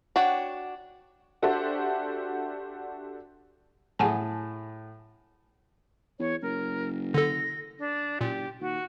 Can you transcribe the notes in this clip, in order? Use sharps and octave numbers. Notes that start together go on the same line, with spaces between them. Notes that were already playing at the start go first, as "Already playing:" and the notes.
D4 F#4 C#5 F#5 G5
D4 F#4 G4 A4 C5 E5
A2 G#4 F#5 G#5 A5
E2 C#5
F#1 A#4
D3 A4 A#6
D4
F#1 A#2 G4
D#2 F#4